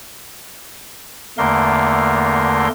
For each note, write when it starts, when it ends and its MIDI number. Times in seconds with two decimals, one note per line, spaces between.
1.38 2.68 40
1.38 2.68 50
1.38 2.68 57
1.38 2.68 58
1.38 2.68 70
1.38 2.68 84